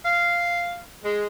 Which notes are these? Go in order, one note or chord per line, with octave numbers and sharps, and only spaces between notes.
F5
G#3